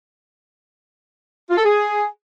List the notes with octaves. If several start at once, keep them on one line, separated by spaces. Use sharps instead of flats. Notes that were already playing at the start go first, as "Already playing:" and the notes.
F4
A4
G#4